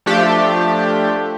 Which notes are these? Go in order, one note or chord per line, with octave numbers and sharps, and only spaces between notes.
F3 A3 D4 G4